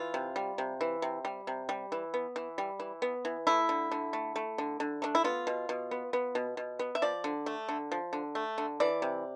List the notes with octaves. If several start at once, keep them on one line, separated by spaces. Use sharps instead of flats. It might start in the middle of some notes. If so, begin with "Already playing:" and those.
Already playing: E3 F4
C3
G3
C3
E3
C3
G3
C3
G3
E3
B3
E3
G3
E3
B3
E3
A3 E4
D3
D3
A3
A3
D3
D3
A3 D4
E4
B3 F4
B2
B2
B3
B3
B2
B2
B3
E5
F3 D5
D3
A3
D3
F3
D3
A3
D3
E3 D5
C3